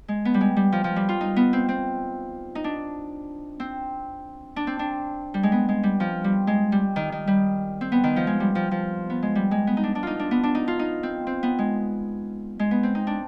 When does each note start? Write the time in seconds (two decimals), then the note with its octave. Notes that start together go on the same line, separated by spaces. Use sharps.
0.08 G#3
0.25 B3
0.34 G3
0.41 G#3
0.57 G3
0.72 F3
0.84 F3
0.96 G3
1.09 F4
1.21 D#4
1.36 B3
1.53 C4
1.69 C4
2.55 D#4
2.64 D4
3.60 C4
4.56 D4
4.67 C4
4.79 D4
5.34 G3
5.43 G#3
5.52 B3
5.69 G#3
5.83 G3
6.00 F3
6.24 G3
6.47 G#3
6.72 G3
6.96 D#3
7.12 D#3
7.27 G3
7.81 C4
7.92 B3
8.04 D#3
8.16 F3
8.27 G#3
8.40 G3
8.55 F3
8.71 F3
9.10 B3
9.22 G#3
9.35 G3
9.51 G#3
9.67 B3
9.77 D#4
9.83 D4
9.95 D4
10.03 D#4 F4
10.19 D4
10.31 B3
10.43 D4
10.55 D#4
10.68 F4
10.79 D#4
11.03 C4
11.27 C4
11.43 B3
11.59 G#3
12.59 G#3
12.71 B3
12.83 C4
12.95 D#4
13.07 D4